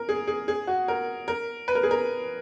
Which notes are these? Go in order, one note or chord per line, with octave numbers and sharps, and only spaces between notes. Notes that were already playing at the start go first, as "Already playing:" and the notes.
Already playing: A#4
G#4
G#4
G#4
F#4
A#4
A#4
B4
A#4
G#4
A#4